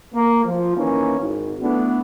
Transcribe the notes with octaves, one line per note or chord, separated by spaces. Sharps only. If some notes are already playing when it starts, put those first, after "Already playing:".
A#3
F3
D#3 E3 A#3 C#4
G#1
E3 A3 B3 D4